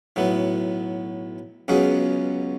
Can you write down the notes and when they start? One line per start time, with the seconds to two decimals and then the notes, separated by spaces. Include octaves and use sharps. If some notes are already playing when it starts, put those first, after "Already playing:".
0.16 B1 A2 F#3 B3
1.68 C#2 B2 F#3 C#4 G#4